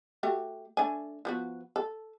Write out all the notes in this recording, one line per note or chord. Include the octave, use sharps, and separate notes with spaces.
A3 F#4 G4
A3 D4 G#5
F3 B3 F#4
A4